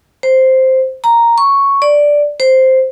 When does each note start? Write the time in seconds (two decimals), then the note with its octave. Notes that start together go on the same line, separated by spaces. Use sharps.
0.23 C5
1.04 A#5
1.38 C#6
1.82 D5
2.40 C5